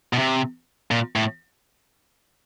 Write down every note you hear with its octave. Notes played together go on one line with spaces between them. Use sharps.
B2
C3
A#2
A2